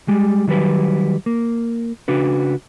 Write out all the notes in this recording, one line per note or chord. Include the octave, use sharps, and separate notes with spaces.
G3 G#3
D#3 F#3 G3 B4
A#3
C#3 D4 F#4 B4